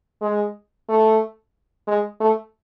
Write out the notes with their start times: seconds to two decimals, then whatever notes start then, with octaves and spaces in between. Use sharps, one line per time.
0.21 G#3
0.89 A3
1.88 G#3
2.20 A3